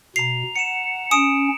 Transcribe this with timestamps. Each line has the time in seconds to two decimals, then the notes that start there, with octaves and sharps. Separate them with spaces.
0.16 B2 A#5 C7 F7
0.56 F#5 C#7 D#7 E7
1.11 C#4 D#6 C#7 D7 E7